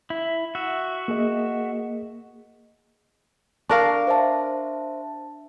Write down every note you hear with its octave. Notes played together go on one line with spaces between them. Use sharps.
E4
F#4 E5
A#3 G#4 D#5
D4 A#4 F5 C#6
C5 E5 A5